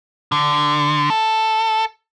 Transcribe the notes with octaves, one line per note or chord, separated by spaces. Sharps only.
D3
A4